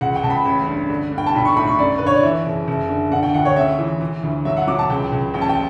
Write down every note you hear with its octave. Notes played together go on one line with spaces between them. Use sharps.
C#2 F#5
G5
C#2 A5
B5
A1
G2
D3
G2
G5
A5
B1 B5
C#6
A2 B5
C#6
F#2 D5
D3 B4
C#5
D5
E3 E5
F#1
F#1
D3
D3 F#5
G5
D2 F#5
C#5
C#3 E5
E3
E3
D2
F#3 E5
F#5
F#3 D6
A5
C#2 G5
C#2
A1 G5
A5
G5